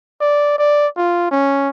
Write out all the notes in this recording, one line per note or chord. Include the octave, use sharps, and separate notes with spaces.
D5
D5
F4
C#4